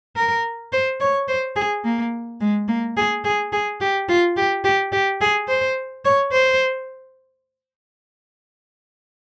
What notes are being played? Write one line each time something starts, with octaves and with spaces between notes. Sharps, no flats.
A#4
C5
C#5
C5
G#4
A#3
G#3
A#3
G#4
G#4
G#4
G4
F4
G4
G4
G4
G#4
C5
C#5
C5